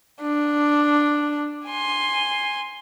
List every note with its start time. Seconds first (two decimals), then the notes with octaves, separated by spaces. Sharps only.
0.22 D4
1.66 G#5 C6